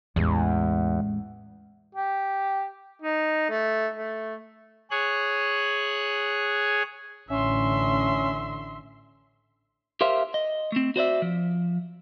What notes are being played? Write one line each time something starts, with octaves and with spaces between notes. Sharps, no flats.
A1 E2 G#3
G4
D#4
A3
A3
G#4 C#5 F#6
A1 D3 C#4 E5 C6
G4 A#4 C5 E5 F5
D#5
A3 C4
F#4 C5 D5 E5
F3